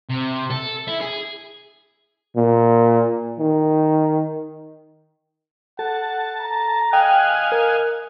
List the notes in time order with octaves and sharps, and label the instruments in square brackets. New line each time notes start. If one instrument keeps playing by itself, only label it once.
[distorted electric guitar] C3
A4
E4
G#4
[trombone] A#2
D#3
[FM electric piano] A4 [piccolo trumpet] F#5 [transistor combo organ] A5
[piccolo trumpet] A#5
[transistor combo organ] D#5 F5 G#5 [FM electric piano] G5 [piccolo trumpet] F#6
[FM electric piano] A#4